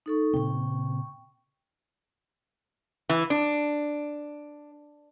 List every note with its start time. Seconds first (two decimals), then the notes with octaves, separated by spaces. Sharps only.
0.06 D#4 A4 C#6
0.34 A#2 C#3 C4 G5 C#6
3.09 E3
3.30 D4